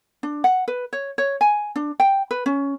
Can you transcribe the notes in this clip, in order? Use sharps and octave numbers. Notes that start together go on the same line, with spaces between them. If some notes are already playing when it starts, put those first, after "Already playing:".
D4
F#5
B4
C#5
C#5
G#5
D4
G5
B4
C#4